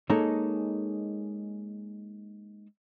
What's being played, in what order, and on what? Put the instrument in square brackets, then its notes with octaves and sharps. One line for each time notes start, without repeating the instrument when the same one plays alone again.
[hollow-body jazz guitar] G#3 A#3 D#4 G#4 A4 C#5